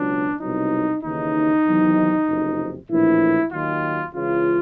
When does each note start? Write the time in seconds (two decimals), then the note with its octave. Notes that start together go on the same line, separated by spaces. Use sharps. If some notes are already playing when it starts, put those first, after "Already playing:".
Already playing: C#2 B2 F#3 D4
0.40 C2 B2 F#3 D#4
1.03 D#2 C#3 E3 D#4
1.64 E2 C3 D#3 F#3
2.27 F#1 F2 C3
2.89 A#1 A2 E3 E4
3.52 D#2 D#3 F#3 F4
4.13 C#2 C#3 E3 F4